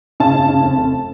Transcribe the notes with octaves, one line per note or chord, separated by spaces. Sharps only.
C#3 A5
C#3
C#3
F1
F1